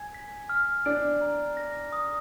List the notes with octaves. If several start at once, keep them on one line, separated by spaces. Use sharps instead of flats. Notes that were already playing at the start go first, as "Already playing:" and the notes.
Already playing: G#5 G#6
B6
F6
D4 D7
A#5
A#6
D#6